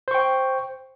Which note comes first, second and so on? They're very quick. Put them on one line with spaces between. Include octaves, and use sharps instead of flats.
C5 C#6 G5